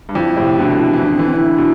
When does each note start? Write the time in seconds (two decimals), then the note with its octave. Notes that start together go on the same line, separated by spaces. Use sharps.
0.09 G2
0.15 F2 E4
0.36 A2 C3
0.58 B2 D3
0.81 D3
0.93 E3
1.03 D3 D4
1.13 C4
1.19 E3
1.25 C4
1.31 D3 E4
1.45 E3
1.57 B2 D3